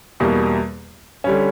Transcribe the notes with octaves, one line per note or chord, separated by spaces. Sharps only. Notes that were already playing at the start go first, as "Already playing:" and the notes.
E2 B2 G3 A#3
D3 G3 C#4